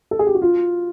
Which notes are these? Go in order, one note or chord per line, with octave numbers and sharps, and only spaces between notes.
A4
G#4
G4
F#4
F4